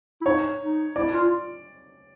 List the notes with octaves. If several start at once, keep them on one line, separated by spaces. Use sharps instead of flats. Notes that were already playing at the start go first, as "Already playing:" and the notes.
E4
D#4 C#5
D#4
E4 D5
F4